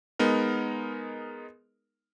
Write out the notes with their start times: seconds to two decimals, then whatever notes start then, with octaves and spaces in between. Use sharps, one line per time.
0.19 G#3 B3 D#4 A#4